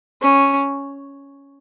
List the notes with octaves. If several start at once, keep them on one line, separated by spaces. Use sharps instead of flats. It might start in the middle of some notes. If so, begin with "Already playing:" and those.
C#4